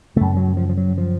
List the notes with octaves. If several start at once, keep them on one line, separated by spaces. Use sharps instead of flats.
F#2 C#3 A3
F#3
F3
F3
F#3
F3